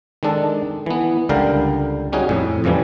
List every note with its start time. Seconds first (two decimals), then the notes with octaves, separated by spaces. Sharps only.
0.23 D#3 G#3 D4 A4
0.86 E3 B3
1.29 C#2 D3 G3 A#4 F5 G5
2.13 G3 C#4 D#4 F#4 G#4
2.29 F2 A2
2.64 F2 A2 C#3 E3 F3 G3